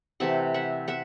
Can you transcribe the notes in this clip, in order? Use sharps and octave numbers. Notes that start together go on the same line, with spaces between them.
C3 E3 A3 E5 F#5
E5 F#5
E5 F#5